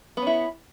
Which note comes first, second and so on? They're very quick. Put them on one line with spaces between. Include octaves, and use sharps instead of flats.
B3 C#4 E4